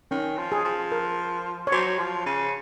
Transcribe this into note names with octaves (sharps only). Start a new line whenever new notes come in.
D#3 C#4
F3
G#4
F3
A#4
C#5
F#3 C5
F3
C#3